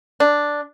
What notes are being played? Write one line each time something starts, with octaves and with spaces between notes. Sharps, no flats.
D4